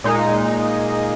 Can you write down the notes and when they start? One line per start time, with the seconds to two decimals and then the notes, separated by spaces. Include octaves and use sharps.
0.04 A#2 G#3 D#4